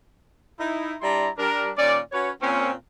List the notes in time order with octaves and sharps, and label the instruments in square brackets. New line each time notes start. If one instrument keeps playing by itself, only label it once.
[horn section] D#4 E4
G3 D4 E4 D5 A#5 C6
G3 D4 A#4
A#2 D#3 C#4 D5
C#4 F#4 B4 C#5
A#2 C4 C#4